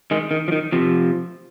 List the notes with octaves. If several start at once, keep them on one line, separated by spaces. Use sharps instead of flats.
D#3 G#3
D#3
F3
D#3
C3 F3